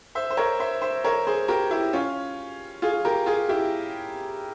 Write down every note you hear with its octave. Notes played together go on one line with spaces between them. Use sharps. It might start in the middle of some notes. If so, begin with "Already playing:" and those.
C5 E5
C5
A#4 C#5
C5 E5
C5 E5
A#4 C#5
G#4 C5
G4 A#4
E4 G4
C#4 F4
F4 G#4
G4 A#4
F4 G#4
E4 G4